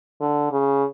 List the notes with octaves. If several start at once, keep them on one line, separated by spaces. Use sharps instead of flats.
D3
C#3